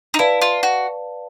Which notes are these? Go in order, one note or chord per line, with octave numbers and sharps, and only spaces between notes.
D#4
E4 B4 D5 F5 A5
F4
F#4